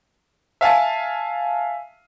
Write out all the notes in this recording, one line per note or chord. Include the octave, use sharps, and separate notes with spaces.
E5 F5 G#5 A5